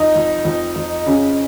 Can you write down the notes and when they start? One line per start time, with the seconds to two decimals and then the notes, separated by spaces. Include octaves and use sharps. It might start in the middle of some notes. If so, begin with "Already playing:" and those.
Already playing: F2 D#4
0.15 F2
0.45 F2
0.76 F2
1.06 C#3